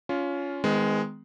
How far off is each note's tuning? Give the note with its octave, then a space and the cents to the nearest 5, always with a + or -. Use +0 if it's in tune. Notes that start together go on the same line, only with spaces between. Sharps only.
C#4 +20 F4 +0
D#3 +15 G#3 +0 B3 +45